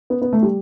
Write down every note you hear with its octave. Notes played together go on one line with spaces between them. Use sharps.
B3
B3
A3
G3